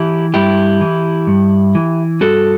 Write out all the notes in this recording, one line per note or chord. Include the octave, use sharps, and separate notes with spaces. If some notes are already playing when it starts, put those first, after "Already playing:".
Already playing: E3 E4 G4
G2 E4 G4
E3
G2
E3
G2 F#4 A4